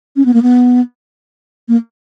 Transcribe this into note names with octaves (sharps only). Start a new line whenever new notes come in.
C#4
B3
A#3
B3
A#3